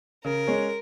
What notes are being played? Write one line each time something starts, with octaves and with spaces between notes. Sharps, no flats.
C#3 A#4
G#3 C#4 G#4 C#5